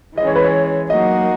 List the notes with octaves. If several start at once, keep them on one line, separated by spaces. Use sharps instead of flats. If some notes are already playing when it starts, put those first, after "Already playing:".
E3 G#3 C#4 D#5
C#5
B4
C#5
F#3 A#3 D#4 F#4 A#4 D#5